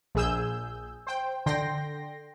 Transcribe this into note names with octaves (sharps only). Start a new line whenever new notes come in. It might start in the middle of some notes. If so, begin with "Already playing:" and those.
A#1 G#4 E6 G6
C5 G5
D3 G5 C6 A#6